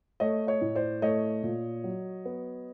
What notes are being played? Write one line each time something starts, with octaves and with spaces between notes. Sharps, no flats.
A3 C#5 D#5
C#5 D#5
A2
C5 D5
A3 C#5 D#5
A#2
F#3
B3